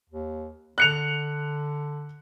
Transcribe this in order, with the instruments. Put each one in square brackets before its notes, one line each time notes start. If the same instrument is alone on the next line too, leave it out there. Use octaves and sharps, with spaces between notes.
[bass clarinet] D#2
[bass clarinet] D3 [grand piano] F#6 C#7 F7